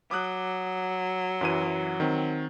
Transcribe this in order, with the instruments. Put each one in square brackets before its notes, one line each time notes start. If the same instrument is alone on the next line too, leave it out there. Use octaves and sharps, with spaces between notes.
[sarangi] F#3 [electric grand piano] D6 D#6 F#6
[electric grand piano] F#2 E3 D#7
D#3 C4